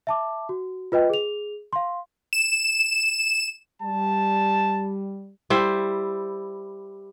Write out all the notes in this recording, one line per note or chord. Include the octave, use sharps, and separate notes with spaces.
E5 A5 D6
F#4
F4 B4 D#5 G5
G#4 F7
F5 C6
E7
G3 A5
G3 E4 C5